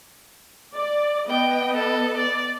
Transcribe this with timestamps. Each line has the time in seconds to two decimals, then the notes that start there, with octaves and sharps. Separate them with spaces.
0.75 D5
1.30 B3 D#5 G5
1.74 A4
2.17 D5